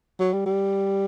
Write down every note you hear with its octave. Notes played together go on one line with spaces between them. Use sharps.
F#3
G3
G3